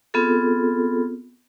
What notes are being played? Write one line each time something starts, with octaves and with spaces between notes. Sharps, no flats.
B3 C4 F4 G#4 A4